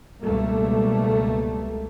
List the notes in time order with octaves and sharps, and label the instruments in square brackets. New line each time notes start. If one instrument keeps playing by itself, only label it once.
[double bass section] C#2 G2 B2 G3 A3 A#3